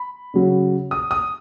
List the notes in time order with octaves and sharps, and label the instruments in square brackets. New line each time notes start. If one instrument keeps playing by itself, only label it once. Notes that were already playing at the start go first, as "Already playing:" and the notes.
Already playing: [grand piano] B5
C#3 F#3 C#4
D#6
D#6